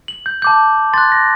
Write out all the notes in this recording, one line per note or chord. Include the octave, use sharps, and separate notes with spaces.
F#7
G6
A5 D6 G6
C6 F#6 A6
A#6